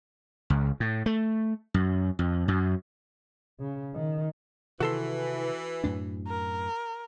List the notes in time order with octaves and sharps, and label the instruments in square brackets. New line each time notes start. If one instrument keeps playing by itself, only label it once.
[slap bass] C#2
A2
A3
F#2
F2
F#2
[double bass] C#3
D#3
[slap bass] C3 D#3 [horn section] E3 [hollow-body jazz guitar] F#4 A4 C6
[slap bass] F#2 A2 D4
[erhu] A#4